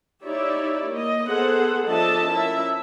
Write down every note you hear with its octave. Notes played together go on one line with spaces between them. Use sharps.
D#4 E4 G4 C#5 D5 E5
A#3 D#5
B3 G#4 A4 C5 F#5
F3 D4 A4 D#5 E5 A5
C#4 E4 A#4 E5